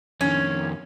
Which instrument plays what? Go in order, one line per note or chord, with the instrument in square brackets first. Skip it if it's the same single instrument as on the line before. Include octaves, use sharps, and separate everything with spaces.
[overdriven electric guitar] F2 D#3 [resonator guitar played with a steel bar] C#4